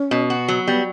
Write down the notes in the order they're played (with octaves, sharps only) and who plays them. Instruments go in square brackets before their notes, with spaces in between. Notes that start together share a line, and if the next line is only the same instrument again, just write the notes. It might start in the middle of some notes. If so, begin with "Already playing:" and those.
Already playing: [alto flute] C#4
[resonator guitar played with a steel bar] B2
F#4
F#3
[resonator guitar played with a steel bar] G3 [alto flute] B3